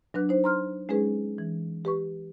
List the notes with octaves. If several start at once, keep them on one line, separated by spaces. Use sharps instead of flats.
F#3 D4 B4 F#6
D#4 C5
A#5 C6 F6
G#3 C#4 D#4 G#4 B4
E3
G4 B4 C#6